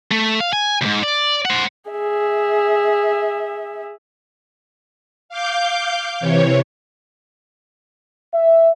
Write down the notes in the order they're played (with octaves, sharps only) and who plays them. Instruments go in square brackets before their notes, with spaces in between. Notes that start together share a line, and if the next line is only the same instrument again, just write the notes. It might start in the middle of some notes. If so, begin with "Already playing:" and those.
[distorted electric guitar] A3
F5
G#5
D2 G#2
D5
C5 F#5
[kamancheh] G#4 E5
[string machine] F5 D6 G6
C3 E3 C#5
[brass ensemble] E5